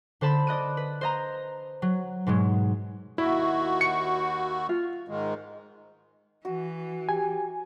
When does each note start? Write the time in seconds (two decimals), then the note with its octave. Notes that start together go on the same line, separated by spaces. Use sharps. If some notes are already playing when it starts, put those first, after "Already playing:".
0.21 D3 C5 A5 B5 B6
0.47 D5 D#5 F#6 D#7
0.77 B4
1.01 C5 D#5 A#5
1.82 F#3
2.27 G#2 B2 F#3 G#3
3.18 D#2 E4 F#4 E5
3.81 C#7
4.69 F4
5.08 G#2 D#3 G#3
6.45 E3 F#4
7.09 G4 G#5